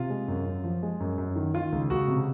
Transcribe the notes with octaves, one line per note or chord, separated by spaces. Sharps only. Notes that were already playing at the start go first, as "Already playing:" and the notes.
Already playing: C3 F4
G#3
F#2
F#2
F3
G#3
F#2
F#2
D#3
D#3 F4
C#2
C#2 F#4
C3